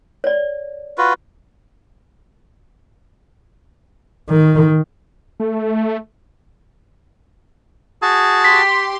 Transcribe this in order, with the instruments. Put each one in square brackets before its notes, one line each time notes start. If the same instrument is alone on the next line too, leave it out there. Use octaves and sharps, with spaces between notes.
[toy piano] C#5 D5
[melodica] F4 F#4 B4
[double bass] D#3
[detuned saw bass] A3
[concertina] F#4 A5 [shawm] G#4
[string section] G4 C6 [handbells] B6